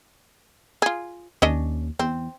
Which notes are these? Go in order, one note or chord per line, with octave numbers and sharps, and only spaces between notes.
F4 G#4
D#2 C#4 D4 D#5
E2 C4